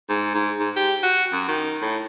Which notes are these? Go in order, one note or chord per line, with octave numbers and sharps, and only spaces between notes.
G#2
G#2
G#2
G4
F#4
F#2
D#3
A2